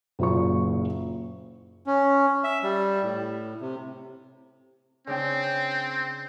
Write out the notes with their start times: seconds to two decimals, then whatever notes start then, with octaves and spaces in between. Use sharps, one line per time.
0.19 F#1 A#2 C#6
1.86 C#4
2.44 E5
2.63 G3
3.03 A2
3.61 C3
5.07 C#3 C4 D4 G5